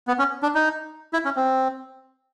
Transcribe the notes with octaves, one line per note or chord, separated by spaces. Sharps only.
B3
C#4
D4
D#4
E4
C#4
C4